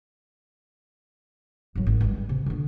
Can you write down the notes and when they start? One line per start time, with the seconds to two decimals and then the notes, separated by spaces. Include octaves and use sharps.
1.75 G#1 F#3
1.87 G#1
2.01 G2 G#3
2.29 C3
2.46 D3 B3